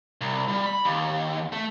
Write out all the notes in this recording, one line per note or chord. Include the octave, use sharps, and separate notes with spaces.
C2
G3
B5
D#2
A3